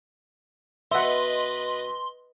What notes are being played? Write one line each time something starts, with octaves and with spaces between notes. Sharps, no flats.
B2 B3 B4 D#5 E5 F#5 C6